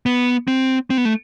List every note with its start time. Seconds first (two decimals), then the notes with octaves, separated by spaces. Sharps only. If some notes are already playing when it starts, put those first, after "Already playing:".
0.06 B3
0.48 C4
0.90 C4
0.97 B3
1.05 A3